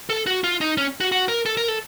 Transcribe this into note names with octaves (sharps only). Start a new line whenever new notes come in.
A4
F#4
F4
D#4
C#4
F#4
F#4
A#4
A4
A#4
A4